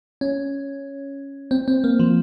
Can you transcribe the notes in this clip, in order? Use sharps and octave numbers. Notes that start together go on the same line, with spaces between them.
C#4
C4
C4
A#3
F3